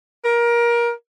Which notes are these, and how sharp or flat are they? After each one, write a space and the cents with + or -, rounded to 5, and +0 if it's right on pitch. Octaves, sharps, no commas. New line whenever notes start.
A#4 +20